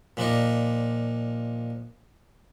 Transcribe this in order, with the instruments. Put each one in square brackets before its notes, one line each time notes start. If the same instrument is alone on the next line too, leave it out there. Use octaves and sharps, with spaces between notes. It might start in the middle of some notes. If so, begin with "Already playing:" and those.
[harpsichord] A#2 F3 D4 D#4